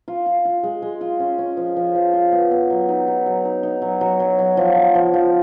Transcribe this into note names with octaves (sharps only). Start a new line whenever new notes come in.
F4
F4
F4
G#3
G#3
F4
C#4
C#4
F3
F3
F3
F4
B3
B3
F#3
D#4
D#4
F#3
D#4
D#4
F#3
F#3
F#3
F#3
F3
F3
F3
F3